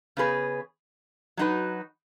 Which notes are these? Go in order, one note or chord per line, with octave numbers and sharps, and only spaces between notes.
C#3 B3 G#4 B4
F#3 D#4 F#4 B4